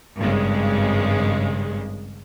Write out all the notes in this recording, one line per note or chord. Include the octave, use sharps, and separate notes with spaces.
G#1 G2 C#3 G#3